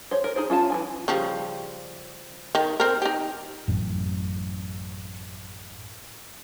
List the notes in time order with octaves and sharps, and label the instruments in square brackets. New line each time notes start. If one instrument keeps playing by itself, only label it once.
[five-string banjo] C5 C#5
A#4
D#4 G#4 C5
C#4 F4 F5 A5
E3 F4 G#5
[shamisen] C#3 F3 G3
D#3
C4 A#4
D#4 G4
[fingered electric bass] A1 F#2